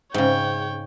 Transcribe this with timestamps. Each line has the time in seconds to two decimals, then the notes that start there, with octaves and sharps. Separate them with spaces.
0.14 G#2 C#3 C#5 G5